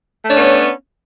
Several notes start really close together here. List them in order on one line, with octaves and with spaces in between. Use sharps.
A3 D4 C#5 C#4 B3